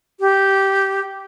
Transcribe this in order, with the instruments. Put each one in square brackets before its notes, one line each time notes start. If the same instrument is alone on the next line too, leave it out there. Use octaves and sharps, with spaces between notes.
[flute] G4